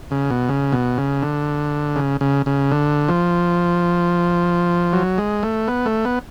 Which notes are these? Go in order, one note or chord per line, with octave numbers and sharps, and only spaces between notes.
C#3
B2
C#3
B2
C#3
D3
C#3
C#3
C#3
D3
F3
F#3
G#3
A3
B3
A3
B3